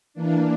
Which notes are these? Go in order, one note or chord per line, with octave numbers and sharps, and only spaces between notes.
E3 A#3 D4